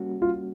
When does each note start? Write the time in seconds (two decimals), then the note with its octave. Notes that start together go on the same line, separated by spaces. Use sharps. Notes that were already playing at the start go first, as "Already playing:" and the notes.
Already playing: G3 A#3 C#4 F#4
0.22 F4